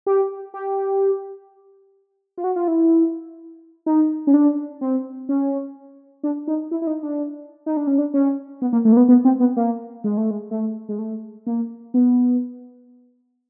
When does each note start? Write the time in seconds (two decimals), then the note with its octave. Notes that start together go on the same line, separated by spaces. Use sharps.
0.06 G4
0.54 G4
2.37 F4
2.44 F#4
2.56 F4
2.68 E4
3.86 D#4
4.27 C#4
4.34 D4
4.81 C4
5.29 C#4
6.23 D4
6.48 D#4
6.71 E4
6.82 E4
6.87 D#4
7.03 D4
7.66 D#4
7.77 D4
7.87 C#4
7.98 D4
8.14 C#4
8.62 B3
8.73 A#3
8.85 A3
8.92 A#3
8.97 B3
9.09 B3
9.25 C4
9.40 B3
9.56 A#3
10.04 G#3
10.17 A3
10.31 G#3
10.51 A3
10.89 G#3
10.99 A3
11.47 A#3
11.94 B3